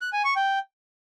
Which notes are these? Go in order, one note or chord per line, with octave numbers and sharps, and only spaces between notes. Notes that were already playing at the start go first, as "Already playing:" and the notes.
F#6
G#5
C#6
G5